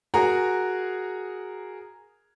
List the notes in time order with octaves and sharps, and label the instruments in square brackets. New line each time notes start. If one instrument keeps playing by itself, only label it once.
[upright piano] F#4 G#4 A#4 A#5